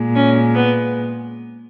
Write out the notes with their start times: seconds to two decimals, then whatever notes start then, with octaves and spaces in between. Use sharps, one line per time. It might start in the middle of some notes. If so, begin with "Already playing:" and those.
Already playing: A#2 G#3
0.15 C#4
0.54 B3